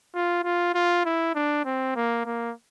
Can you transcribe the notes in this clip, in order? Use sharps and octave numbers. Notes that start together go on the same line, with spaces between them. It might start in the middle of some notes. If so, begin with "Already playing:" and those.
F4
F4
F4
E4
D4
C4
A#3
A#3